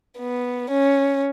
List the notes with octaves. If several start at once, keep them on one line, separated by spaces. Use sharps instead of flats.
B3
C#4